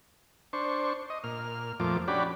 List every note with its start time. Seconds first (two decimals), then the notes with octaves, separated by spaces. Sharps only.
0.53 D4 C5 C#6
1.10 D#5
1.24 A#2 F6
1.80 F2 A#2 F3 A3 D6
2.08 C#4 D4 F#4 G4 D5 B5